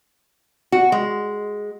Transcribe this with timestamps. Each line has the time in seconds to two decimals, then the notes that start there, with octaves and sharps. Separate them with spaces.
0.72 F#4
0.92 G#3